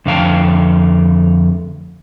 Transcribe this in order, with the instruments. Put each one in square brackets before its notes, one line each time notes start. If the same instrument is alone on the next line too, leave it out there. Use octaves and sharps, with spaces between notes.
[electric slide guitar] F2 D3 A3 F5 G5 A5